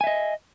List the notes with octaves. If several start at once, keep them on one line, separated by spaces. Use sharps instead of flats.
D#5 E5 G#5